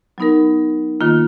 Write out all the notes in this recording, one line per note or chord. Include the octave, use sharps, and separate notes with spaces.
F#3 B3 D#4 A#4
D#3 A#3 F4